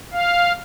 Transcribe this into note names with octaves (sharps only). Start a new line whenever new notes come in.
F5